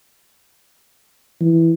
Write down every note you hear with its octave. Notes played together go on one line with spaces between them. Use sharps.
E3